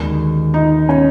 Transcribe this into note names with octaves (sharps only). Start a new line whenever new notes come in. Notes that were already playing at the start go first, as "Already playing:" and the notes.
Already playing: D#2 D#3 G#3 B3 F#4
D#4
C#4